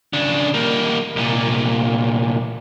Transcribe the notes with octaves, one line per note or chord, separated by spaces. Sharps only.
C#3 D4
G3 A#3
C2 A#2